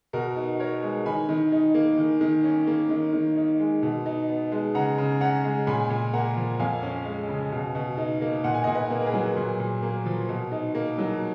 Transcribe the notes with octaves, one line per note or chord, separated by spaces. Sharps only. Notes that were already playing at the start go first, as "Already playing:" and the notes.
B2 F#4 A#4
D#4
B3 A#4 C#5
G#3
D#3 G#5 B5
D#3
D#4
A#3
D#3
D#3
C#4
A#3
D#3
D#3
D#4
G#3
B2
D#4
B3
G#3
C#3 F#5 A#5
C#3
C#4 F#5 A#5
G#3
A#2 G#5 B5
A#2
A#3 F#5 A#5
F3
F2 F5 G#5
C#4
G#3
C#3
B2
B2
D#4
A#3
A#2 F#5
G#5
D#5 F#5
A#2
B4 D#5
A#3
A#4
G#4 B4
F#3
A#2
A#2
A#3
F3
B2
D#4
A#3
F#3